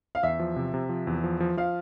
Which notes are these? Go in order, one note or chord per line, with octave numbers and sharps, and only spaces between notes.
F5
E2 E5
F3
C3
C3
F3
E2
F3
F3
F3 F5